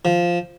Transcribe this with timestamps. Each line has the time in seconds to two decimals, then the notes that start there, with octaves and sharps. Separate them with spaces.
0.05 F3